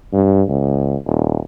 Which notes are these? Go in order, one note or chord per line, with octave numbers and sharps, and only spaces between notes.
G2
C#2
D#1